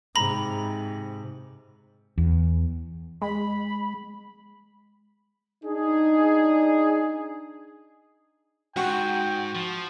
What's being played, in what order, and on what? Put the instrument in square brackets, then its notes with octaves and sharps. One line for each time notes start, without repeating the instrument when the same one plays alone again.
[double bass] G#2 C3 [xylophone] A#5 B5 A#6
[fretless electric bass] E2
[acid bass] G#3 [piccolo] B5
[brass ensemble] D4 D#4 G#4
[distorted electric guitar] G#2 [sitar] F#4 [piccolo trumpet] G5
[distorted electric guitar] F3